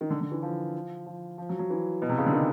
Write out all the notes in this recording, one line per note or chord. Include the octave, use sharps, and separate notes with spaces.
D#3
D3
D3
E3
F3
F3
F3
F#3
F#3
E3
B2
C3
C#3
D3
D#3